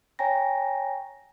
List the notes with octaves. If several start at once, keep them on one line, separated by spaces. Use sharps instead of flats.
C#5 G5 G#5 A#5 A#6